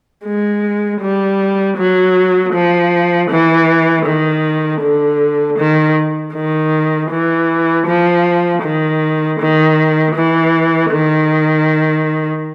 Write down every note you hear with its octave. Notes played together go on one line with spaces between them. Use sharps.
G#3
G3
F#3
F3
E3
D#3
D3
D#3
D#3
E3
F3
D#3
D#3
E3
D#3